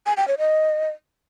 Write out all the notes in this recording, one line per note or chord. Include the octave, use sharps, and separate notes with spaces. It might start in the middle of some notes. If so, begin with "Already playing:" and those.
G#5
G5
C#5
D#5